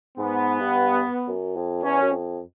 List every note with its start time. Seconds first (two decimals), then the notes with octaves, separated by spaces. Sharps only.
0.18 G#2 B3
0.60 G2
1.28 F#2
1.56 F2
1.83 E2 C#4
2.02 F#2
2.11 F2